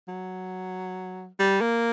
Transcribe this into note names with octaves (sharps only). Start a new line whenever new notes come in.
F#3
G3
A#3